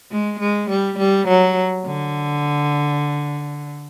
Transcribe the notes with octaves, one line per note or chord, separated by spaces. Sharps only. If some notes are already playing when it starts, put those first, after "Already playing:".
G#3
G#3
G3
G3
F#3
D3